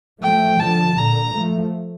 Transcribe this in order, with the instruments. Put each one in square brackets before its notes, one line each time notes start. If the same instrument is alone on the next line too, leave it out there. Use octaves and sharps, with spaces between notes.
[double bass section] F3 A3 [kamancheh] G5
[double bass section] D3 F3 [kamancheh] A5
[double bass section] A#2 D3 [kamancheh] A#5
[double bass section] F3 A3